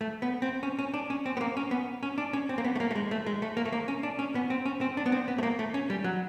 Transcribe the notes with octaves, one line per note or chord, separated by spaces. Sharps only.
A3
B3
C4
C#4
C#4
D4
C#4
C4
B3
A#3
C#4
B3
C#4
D4
C#4
C4
A#3
B3
A3
A#3
A3
G#3
A3
G#3
A3
A#3
A3
A#3
C#4
D4
C#4
B3
C4
C#4
C4
D4
B3
C4
B3
A3
A#3
A3
C#4
G3
F#3